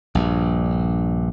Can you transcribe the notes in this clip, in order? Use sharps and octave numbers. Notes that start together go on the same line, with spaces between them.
A#1 G2